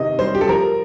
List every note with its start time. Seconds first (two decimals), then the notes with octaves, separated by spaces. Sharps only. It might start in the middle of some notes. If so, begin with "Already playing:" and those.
Already playing: C3 D#3 D#5
0.19 G3 C5
0.35 G4
0.41 A4
0.49 F3 A#4